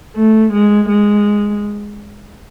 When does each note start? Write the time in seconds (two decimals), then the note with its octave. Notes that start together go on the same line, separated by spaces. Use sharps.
0.16 A3
0.53 G#3
0.89 G#3